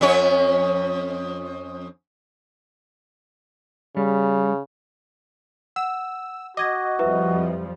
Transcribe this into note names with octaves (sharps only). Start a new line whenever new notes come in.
F2 C#4 C#5
C#3 G3
F#5 E6
F#4 D#5 D6 G#6 A#6
F2 F3 G3 E4 B4 E5